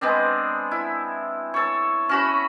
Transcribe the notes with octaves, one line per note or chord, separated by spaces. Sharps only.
G#3 B3 C4 D4
E4
A4 C#5
C#4 F#4 B5